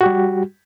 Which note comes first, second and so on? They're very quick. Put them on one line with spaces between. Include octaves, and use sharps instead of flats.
F#4 G4 G3